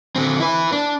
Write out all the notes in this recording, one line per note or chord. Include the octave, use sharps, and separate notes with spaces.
D3 C4
E4 B4
D4